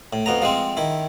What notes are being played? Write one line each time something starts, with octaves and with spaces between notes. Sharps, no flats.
A2
F2 B3 A#5
F3 G#3 C4
D#3 E4